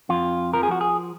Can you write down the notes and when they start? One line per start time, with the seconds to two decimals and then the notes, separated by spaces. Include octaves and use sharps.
0.09 F2 F4
0.53 F3 A#4
0.63 G#4
0.71 F#4
0.81 G#4